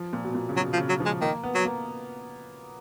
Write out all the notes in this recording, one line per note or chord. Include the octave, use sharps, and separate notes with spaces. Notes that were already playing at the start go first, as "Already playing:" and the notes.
Already playing: F3
A#2
B2
A#2
C#3
B2 F#3
F3
C#3
F#3
F3
G#3
D#3 A#3
B3
F#3
A#3